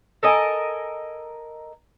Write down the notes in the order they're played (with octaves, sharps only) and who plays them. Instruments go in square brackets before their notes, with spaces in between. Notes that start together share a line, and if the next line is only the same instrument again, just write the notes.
[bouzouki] A4 A#4 D#5 G#5